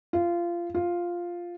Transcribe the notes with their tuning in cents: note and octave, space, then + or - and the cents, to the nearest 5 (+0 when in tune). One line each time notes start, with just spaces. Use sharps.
F4 -20
F4 +0